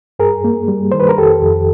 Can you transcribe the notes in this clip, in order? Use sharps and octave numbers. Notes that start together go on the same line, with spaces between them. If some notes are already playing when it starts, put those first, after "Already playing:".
G2 G#4 A#4
A#3
G3
D#3 C5
B4
A#4
F2 G4 A4
F2